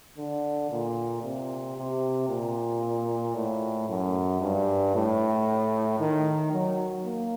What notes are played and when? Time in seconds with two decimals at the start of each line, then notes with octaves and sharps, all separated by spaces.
0.18 D3
0.71 A#2
1.23 C3
1.77 C3
2.29 A#2
3.36 A2
3.88 F#2
4.41 G2
4.95 A2
6.00 D#3
6.53 F#3
7.05 A#3